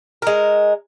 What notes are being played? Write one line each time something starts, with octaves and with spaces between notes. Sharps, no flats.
G#3 A#4